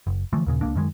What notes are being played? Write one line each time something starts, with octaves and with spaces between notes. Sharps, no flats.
F#1
D3 E3 F3 A3
D#2 A#2 C#3
C#2 F#2 A#3 D4
F#2 D#3 G#3